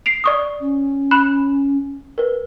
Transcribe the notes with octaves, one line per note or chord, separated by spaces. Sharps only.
C7 D7 F7
D5 C#6 D#6
C#4
B5 F#6 E7
A#4 B4